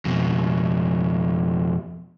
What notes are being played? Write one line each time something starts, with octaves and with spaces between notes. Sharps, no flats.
F2 B2